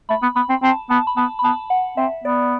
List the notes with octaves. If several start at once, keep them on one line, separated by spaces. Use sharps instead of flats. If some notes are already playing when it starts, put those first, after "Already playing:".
A3 B5
B3
B3 B5
C4
C4 A5
B3 A5
B5
B3 A5
B5
B3 A5
F#5
C4 E5
B3 D5